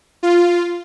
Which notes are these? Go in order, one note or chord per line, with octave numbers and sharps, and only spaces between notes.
F4